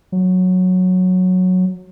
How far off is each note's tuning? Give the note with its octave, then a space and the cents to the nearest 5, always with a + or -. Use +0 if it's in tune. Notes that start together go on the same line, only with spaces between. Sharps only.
F#3 -10